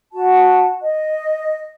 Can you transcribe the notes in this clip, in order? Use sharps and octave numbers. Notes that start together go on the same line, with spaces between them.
F#4 A5
D#5